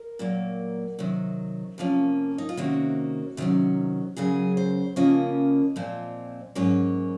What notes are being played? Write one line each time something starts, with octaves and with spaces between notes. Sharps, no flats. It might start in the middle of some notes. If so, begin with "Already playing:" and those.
Already playing: A#4
A#2 F#3 A#3
C3 D#3 F#3
C3 F3 A#3 C#4
D#4
F4
C3 D#3 A#3 C#4 F#4
C3 D#3 F#3 C#4
F#2 C#3 F#3 G#4
C5
C#3 F3 A#3 C#4 D#5
A#2 F3 C4
G#2 F#3 A#3 C#4 C#5